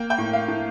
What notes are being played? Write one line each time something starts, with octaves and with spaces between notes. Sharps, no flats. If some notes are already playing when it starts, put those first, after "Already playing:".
Already playing: A#3 G5
G5
A2
F5
A2